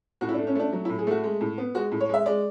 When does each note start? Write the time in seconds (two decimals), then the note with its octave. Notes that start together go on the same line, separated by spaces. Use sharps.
0.21 A2 F#4
0.29 E4
0.34 D4
0.38 A3
0.47 C#4
0.55 A3 D4
0.73 F#3
0.85 E4
0.89 A2
0.99 G#4
1.07 A3 F#4
1.23 G#3
1.41 A2
1.58 B3
1.75 G#3 F#4
1.92 A2
2.00 C#5
2.09 G#3 E5
2.26 G#3 D5